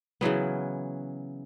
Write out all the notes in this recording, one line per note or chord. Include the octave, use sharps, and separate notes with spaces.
C#3 E3 F#3 B3